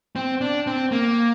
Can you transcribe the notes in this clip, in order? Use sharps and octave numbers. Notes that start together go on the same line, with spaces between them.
C4
D4
C4
A#3